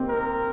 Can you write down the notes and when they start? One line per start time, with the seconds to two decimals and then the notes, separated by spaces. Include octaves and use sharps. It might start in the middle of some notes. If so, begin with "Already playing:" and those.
Already playing: A#3 C4 D#4 G4
0.09 A#4